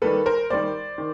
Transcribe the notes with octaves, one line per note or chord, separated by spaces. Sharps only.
D#3 G3 A#3 A4 B4
A#4 C5
D#3 G3 A#3 C5 D5
D#3